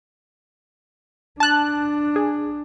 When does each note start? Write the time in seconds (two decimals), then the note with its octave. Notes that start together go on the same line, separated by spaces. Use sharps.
1.40 D4 A5 F#6
2.16 G#4